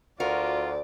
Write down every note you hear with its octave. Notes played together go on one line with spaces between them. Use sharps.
D2 F4 F#4 A#4 D5